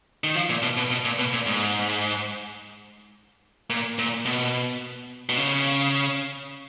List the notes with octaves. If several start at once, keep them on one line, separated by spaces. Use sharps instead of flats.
D#3
F3
A#2
B2
B2
B2
A#2
B2
A#2
G#2
A#2
A#2
B2
B2
C#3